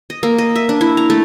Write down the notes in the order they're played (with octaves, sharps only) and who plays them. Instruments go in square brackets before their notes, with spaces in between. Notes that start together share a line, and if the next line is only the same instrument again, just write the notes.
[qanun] D#5
A#3
D#5
E5
D4
E4
A#5
A3